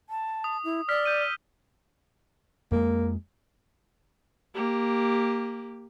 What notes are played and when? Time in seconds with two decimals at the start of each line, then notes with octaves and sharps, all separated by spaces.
0.09 A5
0.44 D#6
0.64 E4
0.89 D5 E6 F6 B6
1.06 G6 D#7
1.21 F6 G7
2.72 F2 G#3 A#3
4.55 A#3 G4